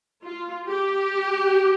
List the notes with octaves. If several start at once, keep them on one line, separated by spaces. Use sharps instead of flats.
F4
G4